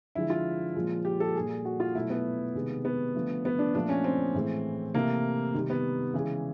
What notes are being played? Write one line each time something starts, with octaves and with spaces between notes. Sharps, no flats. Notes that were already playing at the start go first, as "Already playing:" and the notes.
D3 F3 G#3 E4
F4
A#2 F3 G#3
G4
A4
A#2 G3 G#4
F#4
F4
B2 F#3 A3 E4
B3
C3 D#3 G#3
B3
D3 F3 A3
B3
D4
A#2 F3 A3 D4
C#4
C4
A2 E3 G#3
C3 E3 A3 A#3
C3 D#3 G3
B3
C#3 E3 G#3